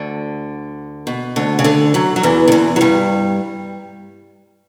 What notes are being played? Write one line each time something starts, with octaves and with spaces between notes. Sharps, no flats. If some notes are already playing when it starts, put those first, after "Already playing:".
Already playing: D2 D3
B2
D2 D3
C#3
D2 D3
F#2 F#3
F#3
E2 E3
D3
E2 E3
F#3
G2 G3